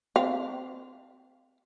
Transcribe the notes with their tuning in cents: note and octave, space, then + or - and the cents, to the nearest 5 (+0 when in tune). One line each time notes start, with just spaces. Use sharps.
C4 -20 F5 +0